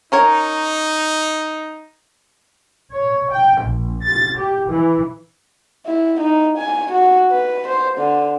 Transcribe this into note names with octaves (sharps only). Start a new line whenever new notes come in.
C#4 D#4 A#4 C#5
C#5
G5
A#1
A6
G4
E3
E4
D#4
G#5
F#4
B4
C5
D3